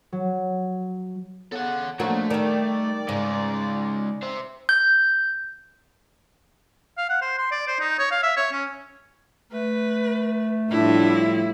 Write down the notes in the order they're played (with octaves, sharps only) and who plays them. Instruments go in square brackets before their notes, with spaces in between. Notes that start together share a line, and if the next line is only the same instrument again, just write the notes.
[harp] F#3
[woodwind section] C#3 B3 [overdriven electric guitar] A4 F#5
[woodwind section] D3 F3 [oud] F#3 A#3 F#4 [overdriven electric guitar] A3
[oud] D#3 G3 [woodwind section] D5
[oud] G#2 [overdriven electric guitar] C#3 G#3
[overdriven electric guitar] C5 E5
[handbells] G6
[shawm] F5
F#5
C5
C6
D5
C5
D#4
C#5
F5
E5
C#5
C#4
[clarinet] A3 [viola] B4
[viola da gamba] A2 F3 G3 [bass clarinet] D4 [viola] E4